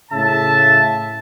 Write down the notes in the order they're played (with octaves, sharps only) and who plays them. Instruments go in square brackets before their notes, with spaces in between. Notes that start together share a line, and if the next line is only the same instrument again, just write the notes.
[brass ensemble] A2 C#3 E5 A5